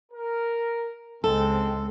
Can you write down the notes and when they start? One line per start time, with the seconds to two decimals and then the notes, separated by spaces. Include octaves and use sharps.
0.12 A#4
1.24 C#2 G#3 C4 A4